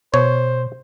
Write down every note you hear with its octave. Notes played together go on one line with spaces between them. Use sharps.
B2 C5 C#5